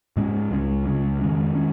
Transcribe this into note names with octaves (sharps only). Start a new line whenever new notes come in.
G#2 G#3 C#4
C#2 C#3 G#3 C#4
C#2 C#3 G#3 C#4
F2 D#3 G#3 C#4
D#3 G#3 C#4